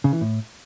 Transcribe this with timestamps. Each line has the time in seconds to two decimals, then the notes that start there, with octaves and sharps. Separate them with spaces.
0.04 C#3
0.13 E3
0.21 A2